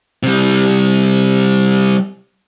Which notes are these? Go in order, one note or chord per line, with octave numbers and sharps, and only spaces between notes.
C3 G3